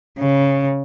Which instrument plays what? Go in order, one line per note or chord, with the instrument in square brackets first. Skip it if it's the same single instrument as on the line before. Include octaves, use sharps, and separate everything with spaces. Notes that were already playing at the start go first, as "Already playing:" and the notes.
[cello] C#3